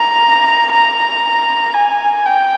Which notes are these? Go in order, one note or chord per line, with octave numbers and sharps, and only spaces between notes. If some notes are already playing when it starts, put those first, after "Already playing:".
Already playing: A#5
A#5
G#5
G5